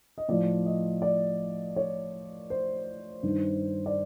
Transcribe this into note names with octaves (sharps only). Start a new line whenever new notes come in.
D#5
A2 F3 D5
D#5
D5
C#5
C5
G2 D#3
D5